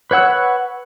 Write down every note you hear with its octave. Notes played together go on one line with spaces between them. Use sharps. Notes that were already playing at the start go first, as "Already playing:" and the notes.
B4 C#5 F#5 E6